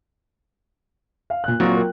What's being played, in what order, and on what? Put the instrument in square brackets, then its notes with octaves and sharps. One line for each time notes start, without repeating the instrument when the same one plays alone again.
[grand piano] F5
A#2 F#6
[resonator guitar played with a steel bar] A#2 F#4 [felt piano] F#3 A#3 F4 [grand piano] C4
[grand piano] A#4 G5